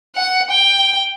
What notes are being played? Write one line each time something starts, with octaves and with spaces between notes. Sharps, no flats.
F#5
G5